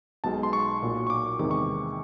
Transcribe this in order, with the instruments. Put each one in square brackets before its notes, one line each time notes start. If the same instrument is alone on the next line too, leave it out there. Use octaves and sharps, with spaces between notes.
[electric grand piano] B1 B2 G#3 A5
A5
C6
C#6
B1 A#2 F#3
C#6
D6
E2 C3 D#3 G#3 D6
C#6